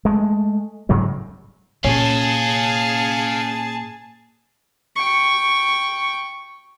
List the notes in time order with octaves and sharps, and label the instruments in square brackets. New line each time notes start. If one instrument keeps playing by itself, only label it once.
[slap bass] G#3 A3
G#2 C#3 F#3 G3
[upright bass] A#2 [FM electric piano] C#4 [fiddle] G#4 A5 [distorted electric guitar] F5 G#5
[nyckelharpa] G5 C#6